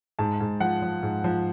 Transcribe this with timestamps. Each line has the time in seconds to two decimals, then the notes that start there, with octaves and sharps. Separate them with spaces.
0.19 G#2 A5
0.40 G#2
0.60 F3 F#5
0.82 F3
1.03 G#2
1.24 F3